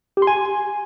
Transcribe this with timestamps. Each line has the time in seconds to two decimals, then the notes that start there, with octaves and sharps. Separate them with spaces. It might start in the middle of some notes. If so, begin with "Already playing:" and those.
0.17 G4
0.22 C6
0.27 G#5